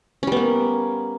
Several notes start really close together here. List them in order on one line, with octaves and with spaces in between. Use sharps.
C#4 G3 B3 A#3